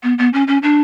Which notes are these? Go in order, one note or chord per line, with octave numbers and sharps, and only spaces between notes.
B3
B3
C#4
C#4
D4